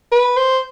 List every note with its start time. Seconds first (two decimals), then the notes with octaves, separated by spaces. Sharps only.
0.12 B4
0.37 C5